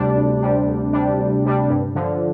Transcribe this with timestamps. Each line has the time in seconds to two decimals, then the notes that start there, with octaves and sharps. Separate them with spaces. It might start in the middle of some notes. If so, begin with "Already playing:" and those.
Already playing: D2 C3 G3 D4
0.16 D2
0.41 C3 G3 D4
0.67 D2
0.93 C3 G3 D4
1.18 D2
1.44 C3 G3 D4
1.69 G2
1.95 D3 F3